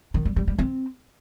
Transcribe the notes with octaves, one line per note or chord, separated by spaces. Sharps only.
D#3
G3
G3
G3
C4